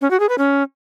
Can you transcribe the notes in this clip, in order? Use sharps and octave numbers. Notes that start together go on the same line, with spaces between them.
C#4
F#4
G#4
B4
C#4